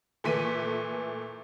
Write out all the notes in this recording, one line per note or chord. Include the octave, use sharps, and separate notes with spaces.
A#2 E3 A3 B6 D#7